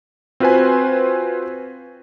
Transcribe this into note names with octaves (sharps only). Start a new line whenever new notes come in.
C4 F4 F#4 B4 C5 G#5